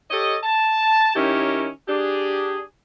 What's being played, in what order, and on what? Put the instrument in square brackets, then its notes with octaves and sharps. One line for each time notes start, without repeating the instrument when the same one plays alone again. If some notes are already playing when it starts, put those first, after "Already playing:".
[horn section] G4 A4 C#5 D#5
A5
D#3 C#4 E4 G4 A#4 C#5
D4 G4 G#4